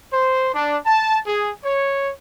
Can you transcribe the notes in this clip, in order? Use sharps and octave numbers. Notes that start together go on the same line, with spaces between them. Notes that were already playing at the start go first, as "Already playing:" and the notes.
C5
D4
A5
G#4
C#5